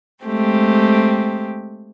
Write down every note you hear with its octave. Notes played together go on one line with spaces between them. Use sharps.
G#3 A3 C4 G4